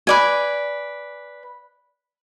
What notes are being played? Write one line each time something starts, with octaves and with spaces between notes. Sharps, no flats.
B4 D5 G#5